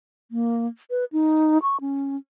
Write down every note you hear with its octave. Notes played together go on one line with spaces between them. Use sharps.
A#3
B4
D#4
C#6
C#4